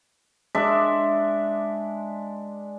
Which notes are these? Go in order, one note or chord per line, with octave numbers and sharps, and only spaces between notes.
G#3 D4 E5